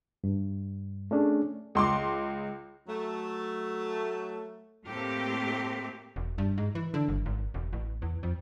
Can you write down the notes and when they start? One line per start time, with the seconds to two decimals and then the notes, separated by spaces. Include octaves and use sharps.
0.24 G2
1.11 A3 C#4 D4 G#4
1.75 C#2 C6 D6
2.88 F#3 A3
4.85 A2 A3 A#3 C4 G4
6.16 E1
6.38 G2
6.58 G#2
6.75 E3
6.94 D3
7.08 G1
7.26 G#1
7.54 E1
7.73 A1
8.02 E2
8.23 F2